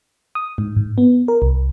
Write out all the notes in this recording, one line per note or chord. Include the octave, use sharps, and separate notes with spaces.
D#6
G#2
G#2
B3
A#4
C2